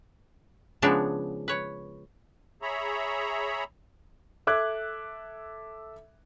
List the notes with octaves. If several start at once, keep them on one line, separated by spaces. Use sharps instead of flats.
C#3 F3 G#3 B3 D4 D#4
B4 C#5
G#4 C#5 E5 A#5 B5
A4 E5 D6 F#6 G#6